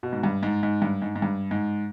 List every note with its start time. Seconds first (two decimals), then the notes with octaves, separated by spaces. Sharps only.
0.03 B2
0.13 G#2
0.23 G2
0.43 G#2
0.63 G#2
0.82 G2
1.02 G#2
1.16 G#2
1.22 G2
1.51 G#2